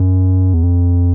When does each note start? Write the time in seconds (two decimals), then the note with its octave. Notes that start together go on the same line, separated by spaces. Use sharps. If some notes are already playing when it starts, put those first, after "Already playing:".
Already playing: F#2
0.54 E2
0.63 F2